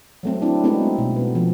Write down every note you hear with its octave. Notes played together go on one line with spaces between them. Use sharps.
F#3 A3 C4
D4 E4
G#3 A3 B3 C4 D#4 F#4
B2
B3
F3